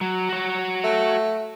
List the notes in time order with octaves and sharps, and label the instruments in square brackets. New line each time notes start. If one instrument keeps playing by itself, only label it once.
[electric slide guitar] F#3
F#4 C#5
[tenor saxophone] A3